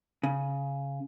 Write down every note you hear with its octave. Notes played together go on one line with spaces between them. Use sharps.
C#3